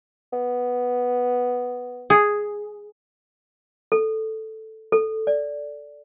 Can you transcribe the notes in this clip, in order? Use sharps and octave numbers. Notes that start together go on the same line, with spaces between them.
B3
G#4
A4
A4
D5